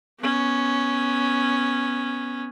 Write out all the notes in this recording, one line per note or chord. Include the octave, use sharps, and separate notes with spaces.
B3 C#4